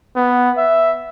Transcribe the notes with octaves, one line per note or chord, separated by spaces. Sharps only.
B3
E5